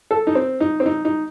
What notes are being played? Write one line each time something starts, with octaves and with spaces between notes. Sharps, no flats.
A4
D#4
C4
D#4
C4
D#4
D#4